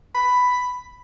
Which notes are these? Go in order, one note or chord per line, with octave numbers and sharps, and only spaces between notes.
B5